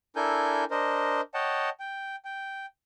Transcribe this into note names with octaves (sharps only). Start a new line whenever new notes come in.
D4 E4 A4 A#4 G#5 G6
D4 A#4 C5 D#5
C#5 D#5 F#5 G5 A5
G5
G5